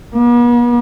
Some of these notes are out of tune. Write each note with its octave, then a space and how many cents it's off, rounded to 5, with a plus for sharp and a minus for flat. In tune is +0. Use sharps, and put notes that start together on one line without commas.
B3 -45